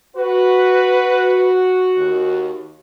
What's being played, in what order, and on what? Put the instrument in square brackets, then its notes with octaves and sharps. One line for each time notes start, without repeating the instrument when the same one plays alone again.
[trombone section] F#4 [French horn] B4
[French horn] D#2